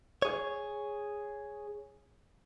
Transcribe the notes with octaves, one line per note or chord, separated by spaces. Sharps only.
G#4 C#5